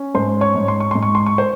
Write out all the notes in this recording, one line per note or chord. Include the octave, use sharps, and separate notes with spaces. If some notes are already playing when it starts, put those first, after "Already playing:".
Already playing: C#4
G#2 C5 C6
C#5 C#6
G#2
C6
C#6
G#2 C6
C#6
C6
C#6
C5 C6